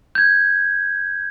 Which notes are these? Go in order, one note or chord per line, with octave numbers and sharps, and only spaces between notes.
G6 G#6